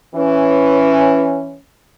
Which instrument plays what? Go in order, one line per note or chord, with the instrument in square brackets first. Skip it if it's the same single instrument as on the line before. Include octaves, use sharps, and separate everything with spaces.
[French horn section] E3 C#4